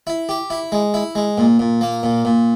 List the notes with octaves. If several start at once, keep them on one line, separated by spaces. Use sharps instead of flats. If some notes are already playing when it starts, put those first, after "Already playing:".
E4
G4
E4
G#3
E4
G#3
A#2
A#2
A#3
A#2
A#2